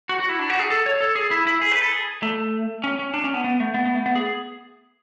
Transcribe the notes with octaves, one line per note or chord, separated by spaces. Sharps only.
F#4
F#4
E4
D4
F#4
G#4
A4
C#5
A4
G#4
E4
E4
G#4
B4
A4
G#4
A3
C#4
C#4
D4
C#4
B3
B3
A3
B3
B3
A3
B3
G#4